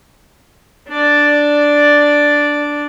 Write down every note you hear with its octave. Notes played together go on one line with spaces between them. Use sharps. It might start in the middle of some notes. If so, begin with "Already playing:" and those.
D4 D5